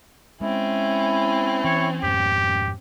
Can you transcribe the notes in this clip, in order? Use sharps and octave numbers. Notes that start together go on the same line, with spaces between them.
G#3 C4 C#4 E4
E3 C#5
F2 G#2 G4